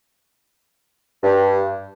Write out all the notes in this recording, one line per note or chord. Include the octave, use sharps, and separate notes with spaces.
G2